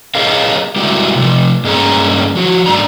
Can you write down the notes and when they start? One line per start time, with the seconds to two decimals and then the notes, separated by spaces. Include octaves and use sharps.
0.15 G4 G#4 A#4 C#5 D#5 F5
0.76 G3 G#3 E4 F#4 G4
1.16 C3 F3
1.64 G2 G#3 A#3 C#4 G#4 A#5
2.35 F3 F#4
2.66 G#2 G#3 D4 A#5